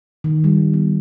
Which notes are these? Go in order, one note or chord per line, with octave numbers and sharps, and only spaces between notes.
D#3
G3
B3